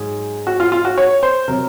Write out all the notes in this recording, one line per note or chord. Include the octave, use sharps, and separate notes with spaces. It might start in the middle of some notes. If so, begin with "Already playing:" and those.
Already playing: G#2 F#3 G#4
F#4
F4
F4
F#4
C#5
C5
C3 F#3 A#4